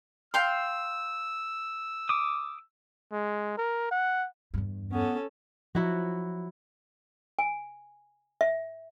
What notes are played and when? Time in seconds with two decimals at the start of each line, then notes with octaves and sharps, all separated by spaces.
0.34 F5 G5 C6 E6
2.09 D6 D#6
3.12 G#3
3.57 A#4
3.91 F#5
4.54 E2 G2
4.92 B3 C#4 A4
5.75 F3 F#3 E4 F#4
7.39 G#5
8.41 E5